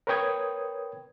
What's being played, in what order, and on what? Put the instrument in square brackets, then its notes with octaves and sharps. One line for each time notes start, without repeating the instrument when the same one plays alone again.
[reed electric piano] A#4 B4 C#5 G5 D#6 G#6